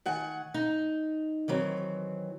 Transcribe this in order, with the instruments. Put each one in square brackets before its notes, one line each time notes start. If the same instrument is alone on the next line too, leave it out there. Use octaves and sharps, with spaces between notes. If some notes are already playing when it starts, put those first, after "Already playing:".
[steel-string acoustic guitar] D#3 F#5 G#5
D#4
D#3 E3 F#3 C4